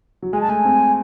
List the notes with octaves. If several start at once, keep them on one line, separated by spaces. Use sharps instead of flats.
F#3
G#3 G#5
A5
A3 G#5
C4